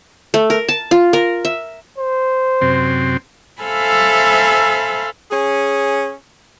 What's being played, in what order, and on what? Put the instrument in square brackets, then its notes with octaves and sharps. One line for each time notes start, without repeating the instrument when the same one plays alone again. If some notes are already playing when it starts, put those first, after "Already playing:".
[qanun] A3
A#4
A5
F4
A#4
E5
[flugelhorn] C5
[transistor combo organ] F#2 C3 C4
[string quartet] A4 C5 E5 F5 G#5 B5
[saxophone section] C#4 G#4